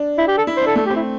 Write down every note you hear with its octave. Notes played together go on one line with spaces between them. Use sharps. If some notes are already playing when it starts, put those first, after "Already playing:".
Already playing: D4
E4
G4
A4
E4
C5
D4 A4
A3 A4
G4
C4
E4